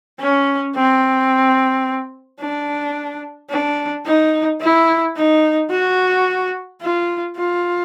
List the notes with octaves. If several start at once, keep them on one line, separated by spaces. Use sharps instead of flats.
C#4
C4
D4
D4
D#4
E4
D#4
F#4
F4
F4